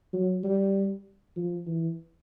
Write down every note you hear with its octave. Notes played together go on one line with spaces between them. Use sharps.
F#3
G3
F3
E3